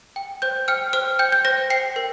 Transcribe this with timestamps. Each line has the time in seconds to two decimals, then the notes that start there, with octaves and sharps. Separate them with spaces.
0.16 G5
0.42 C5 G6
0.68 G5 F6
0.93 C5 F6
1.19 G5 G6
1.32 G6
1.45 C5 A#6
1.70 G5 C7
1.96 A#4